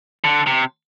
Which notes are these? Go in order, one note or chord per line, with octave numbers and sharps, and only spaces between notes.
D3
C3